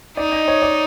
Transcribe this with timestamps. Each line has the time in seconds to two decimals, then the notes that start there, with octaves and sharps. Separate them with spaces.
0.17 D#4 D5
0.32 D#5
0.48 C#5
0.62 D5